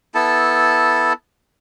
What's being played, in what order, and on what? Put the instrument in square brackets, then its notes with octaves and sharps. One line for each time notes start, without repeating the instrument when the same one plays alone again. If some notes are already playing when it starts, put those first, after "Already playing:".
[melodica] B3 E4 A4 A5